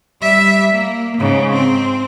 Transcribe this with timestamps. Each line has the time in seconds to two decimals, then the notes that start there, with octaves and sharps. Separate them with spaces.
0.21 G3 E5
0.72 A#3
1.17 G#2 C#3
1.53 C4